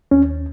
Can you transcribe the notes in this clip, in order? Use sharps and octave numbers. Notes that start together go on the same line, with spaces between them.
D#2 C#4